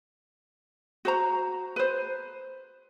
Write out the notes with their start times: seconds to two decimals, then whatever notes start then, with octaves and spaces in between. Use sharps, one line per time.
1.05 F#4 C5 A#5
1.76 B4 C5